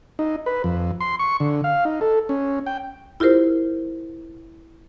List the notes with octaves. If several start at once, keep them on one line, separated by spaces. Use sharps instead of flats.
D#4
B4
F2
C6
C#6
D3
F5
D#4
A4
C#4
G5
E4 F4 G4 A#4 C5